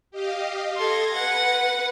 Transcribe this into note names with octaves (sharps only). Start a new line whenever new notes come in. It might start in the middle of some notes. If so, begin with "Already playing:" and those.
G4 D#5 F5
A4 C6 G#6 A#6
B4 F#5